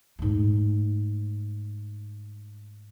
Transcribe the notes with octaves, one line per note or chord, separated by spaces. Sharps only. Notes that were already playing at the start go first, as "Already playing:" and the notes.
G#2 A3